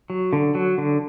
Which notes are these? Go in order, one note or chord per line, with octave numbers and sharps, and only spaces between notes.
F#3
D3
F#3
D3